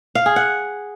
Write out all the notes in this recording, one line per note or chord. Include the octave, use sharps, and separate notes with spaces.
F5
G#4
F#5